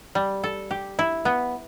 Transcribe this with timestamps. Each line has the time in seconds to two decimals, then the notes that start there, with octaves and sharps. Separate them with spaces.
0.15 G3
0.44 A4
0.71 G4
0.99 E4
1.25 B3